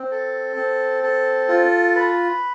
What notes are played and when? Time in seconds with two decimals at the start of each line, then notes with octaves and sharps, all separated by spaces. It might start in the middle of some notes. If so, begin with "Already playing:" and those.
Already playing: C4
0.11 A4
0.57 C4
1.03 A4
1.49 F4
1.95 B4